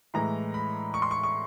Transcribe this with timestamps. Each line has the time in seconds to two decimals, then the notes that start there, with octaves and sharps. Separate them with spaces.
0.14 A2 E3 G#3 A#5
0.54 B5
0.94 C#6
1.02 C6
1.11 C#6
1.23 C#6